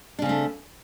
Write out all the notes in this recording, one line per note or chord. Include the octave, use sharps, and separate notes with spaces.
C#3 A3 C4 D4